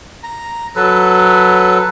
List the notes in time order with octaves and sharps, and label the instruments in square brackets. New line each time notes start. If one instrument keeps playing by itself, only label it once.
[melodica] A#5
F#3 A4 B4